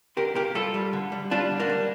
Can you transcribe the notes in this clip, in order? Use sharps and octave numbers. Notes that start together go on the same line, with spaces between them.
D3 G4 A#4
A#3 G4 A#4
G3 F4 A4
G3
D3
G3
G3 D4 F4
D3
A#3 D4
G3